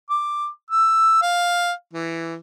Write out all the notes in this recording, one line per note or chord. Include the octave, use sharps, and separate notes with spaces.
D6
E6
F5
E3